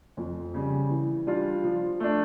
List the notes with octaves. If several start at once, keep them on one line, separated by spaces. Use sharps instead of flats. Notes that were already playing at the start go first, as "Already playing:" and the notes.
F2
C#3 G3
E3
G3 D4 F4
F3
A3 D4